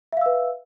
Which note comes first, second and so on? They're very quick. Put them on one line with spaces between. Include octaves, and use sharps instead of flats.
E5 F5 E6 B4